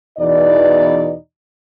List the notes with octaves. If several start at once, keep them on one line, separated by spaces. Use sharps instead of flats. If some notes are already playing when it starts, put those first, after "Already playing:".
E2 B2 E3 D#4 D5